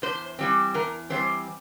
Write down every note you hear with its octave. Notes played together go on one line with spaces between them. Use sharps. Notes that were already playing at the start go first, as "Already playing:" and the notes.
E2 C5
E3 G3 C4
E2 A#4
E3 G3 C4 C5